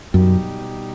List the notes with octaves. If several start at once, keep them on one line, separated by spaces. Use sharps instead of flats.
F#2 B2 G3 D#4 G4